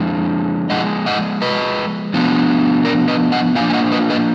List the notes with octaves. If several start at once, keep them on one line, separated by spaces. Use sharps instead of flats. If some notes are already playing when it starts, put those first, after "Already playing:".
Already playing: F3 G#3 D4
F3 G#3 D#5 F#5
D#5 F#5
B4 D#5
F3 B3 D4
A#4 D5
B4 D#5
D#5 F#5
F3 A#3 D4 F5 G#5
G#5
D#5 F#5
B4 D#5
B4 D#5